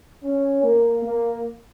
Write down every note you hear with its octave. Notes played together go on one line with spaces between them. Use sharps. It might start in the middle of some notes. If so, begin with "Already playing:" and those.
C#4
A#3
A#3